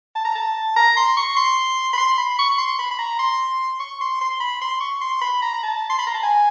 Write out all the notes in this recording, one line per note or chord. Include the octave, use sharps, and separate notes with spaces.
A5
A#5
A5
A#5
C6
C#6
C6
B5
C6
B5
C#6
C6
B5
B5
A#5
C6
C#6
C6
C6
B5
C6
C#6
C6
B5
A#5
A#5
A5
C6
B5
A#5
A5
G#5